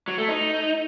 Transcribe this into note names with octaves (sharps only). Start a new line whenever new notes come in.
F#3
A3
D#4